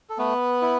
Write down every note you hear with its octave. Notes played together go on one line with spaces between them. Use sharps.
A4
A3 B3 B4
E4